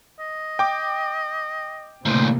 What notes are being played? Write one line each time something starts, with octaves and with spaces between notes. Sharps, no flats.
D#5
G5 D6
D2 A2 C3 E3 A#3 C5